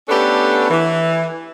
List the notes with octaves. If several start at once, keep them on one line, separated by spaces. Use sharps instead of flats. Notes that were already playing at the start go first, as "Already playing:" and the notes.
A3 B3 C#4 D4 G4 A4
E3